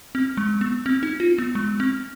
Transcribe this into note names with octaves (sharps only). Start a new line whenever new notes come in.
C4
G#3
B3
C4
D#4
F4
B3
G#3
C4